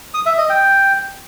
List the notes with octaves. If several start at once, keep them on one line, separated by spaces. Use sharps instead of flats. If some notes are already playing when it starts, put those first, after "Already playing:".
D#6
E5
D#5
G5